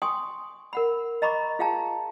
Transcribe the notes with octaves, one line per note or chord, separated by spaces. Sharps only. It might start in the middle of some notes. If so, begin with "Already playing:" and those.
G5 G#5 C6 C#6 D#6
A#4 F#5 B5
D#5 A#5 B5 C#6 D6
F4 G#4 F5 G5 A5 A#5